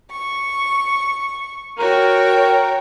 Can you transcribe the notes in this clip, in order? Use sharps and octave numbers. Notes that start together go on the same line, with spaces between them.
C#6
F#4 A#4 C#5 G5